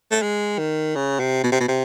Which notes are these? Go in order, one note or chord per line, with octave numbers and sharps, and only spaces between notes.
A3
G#3
D#3
C#3
C3
B2
C3
B2
C3